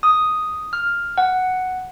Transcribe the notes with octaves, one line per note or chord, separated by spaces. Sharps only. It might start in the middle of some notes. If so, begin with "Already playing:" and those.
D#6
F6
F#5